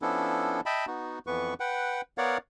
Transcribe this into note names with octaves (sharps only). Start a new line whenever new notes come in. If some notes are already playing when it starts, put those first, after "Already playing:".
F3 B3 C#4 D4 E4 A4
D#5 E5 G5 A5 B5
B3 D#4 F#4
F2 E3 B3 B4 C#6
B4 F#5 G5
B3 A#4 C#5 D5 F5 F#5